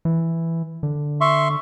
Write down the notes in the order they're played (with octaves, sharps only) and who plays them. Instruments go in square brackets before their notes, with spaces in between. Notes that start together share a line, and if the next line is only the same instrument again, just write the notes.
[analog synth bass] E3
D3
[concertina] E5 C6 C#6